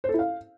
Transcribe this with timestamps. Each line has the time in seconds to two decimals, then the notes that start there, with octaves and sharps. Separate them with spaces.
0.04 C5
0.09 A4
0.14 E4
0.19 F5